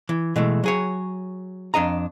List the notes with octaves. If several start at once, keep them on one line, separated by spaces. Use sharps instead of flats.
E3
B2 E3 G#3 A3
F#3 G#4 C#5
F2 D4 D#5 A#5